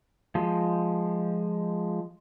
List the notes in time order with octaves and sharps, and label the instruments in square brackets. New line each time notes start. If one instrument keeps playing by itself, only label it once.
[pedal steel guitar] F3 G#3